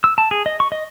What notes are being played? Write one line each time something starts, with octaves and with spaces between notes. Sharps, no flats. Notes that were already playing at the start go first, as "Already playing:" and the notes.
E6
A5
G#4
D#5
C#6
D#5